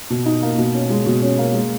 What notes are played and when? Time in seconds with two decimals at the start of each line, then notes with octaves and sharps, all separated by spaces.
0.10 B2
0.26 D#4
0.42 A#3
0.58 B2
0.74 C#4
0.90 G#3
1.06 B2
1.22 C#4
1.38 A#3
1.54 G#3